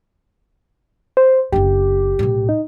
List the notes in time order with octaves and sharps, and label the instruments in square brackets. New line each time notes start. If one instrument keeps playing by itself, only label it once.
[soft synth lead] C5
[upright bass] F#1 D4 [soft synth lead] G4
[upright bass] B1 A2
[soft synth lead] D#4